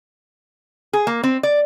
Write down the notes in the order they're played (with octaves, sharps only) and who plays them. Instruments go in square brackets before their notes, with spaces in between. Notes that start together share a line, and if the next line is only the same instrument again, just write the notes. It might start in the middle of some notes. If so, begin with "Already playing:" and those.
[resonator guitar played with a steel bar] G#4
A#3
C4
D5